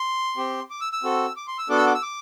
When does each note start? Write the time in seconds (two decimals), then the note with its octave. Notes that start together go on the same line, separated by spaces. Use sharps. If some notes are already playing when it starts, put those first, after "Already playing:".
Already playing: C6
0.37 C4 G4
0.70 D6
0.81 E6
0.93 E6
1.03 C4 F#4 A4
1.37 D6
1.48 C6
1.58 E6
1.69 B3 D4 F#4 A4 D6
1.78 E6
1.87 D6
1.94 E6
2.02 D6